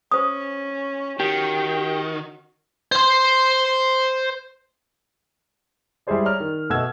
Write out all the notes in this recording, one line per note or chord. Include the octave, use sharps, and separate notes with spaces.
C#4 C5 D#6
D#3 F#4 G4
C5 C6
G3 G#3 E4 G#4 C5 D5
C#5 D5 A#5 F6
D#3
B2 A3 D#5 F#5 E6 G#6